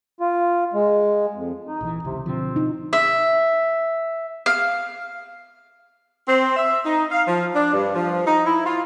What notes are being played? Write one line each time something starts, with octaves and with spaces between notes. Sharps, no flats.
F4
G#3
F2
D#4
A#1 D3 E3
F#1 C#2 C3
B2 D3 F3 C4
D#4
E5
F5
C4
E5
D#4
F5
F3
D4
G2
F3
D#4
E4
F4